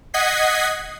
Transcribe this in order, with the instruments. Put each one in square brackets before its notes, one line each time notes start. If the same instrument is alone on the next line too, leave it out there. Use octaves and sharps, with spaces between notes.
[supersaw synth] D#5 F#5 G#6 B6 C7